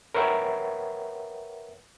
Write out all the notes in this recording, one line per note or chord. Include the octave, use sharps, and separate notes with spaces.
A#4 B4 C#5 E5 F#5 G5